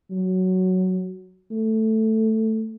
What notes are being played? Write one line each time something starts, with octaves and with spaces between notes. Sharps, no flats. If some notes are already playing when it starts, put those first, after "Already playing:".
F#3
A3